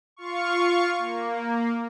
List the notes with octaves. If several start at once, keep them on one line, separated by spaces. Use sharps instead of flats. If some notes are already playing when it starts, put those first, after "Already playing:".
F4 F5 C#6
A#3